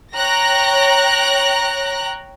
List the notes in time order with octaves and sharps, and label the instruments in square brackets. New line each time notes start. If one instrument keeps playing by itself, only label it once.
[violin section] C#5 G5 A#5 F#6 A#6